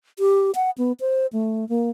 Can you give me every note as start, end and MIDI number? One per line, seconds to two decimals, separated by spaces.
0.19 0.51 67
0.55 0.70 78
0.78 0.92 59
1.00 1.27 72
1.33 1.68 57
1.69 1.90 58